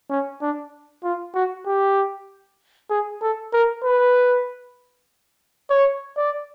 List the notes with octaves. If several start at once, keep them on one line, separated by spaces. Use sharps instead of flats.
C#4
D4
F4
F#4
G4
G#4
A4
A#4
B4
C#5
D5